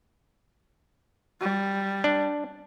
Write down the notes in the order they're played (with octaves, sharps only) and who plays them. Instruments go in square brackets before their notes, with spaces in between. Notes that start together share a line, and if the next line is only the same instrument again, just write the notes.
[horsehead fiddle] G3
[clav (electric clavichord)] D4